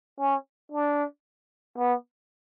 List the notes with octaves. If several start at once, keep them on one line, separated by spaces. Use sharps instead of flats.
C#4
D4
B3